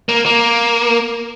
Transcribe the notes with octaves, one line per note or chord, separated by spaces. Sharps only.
A#3
A#3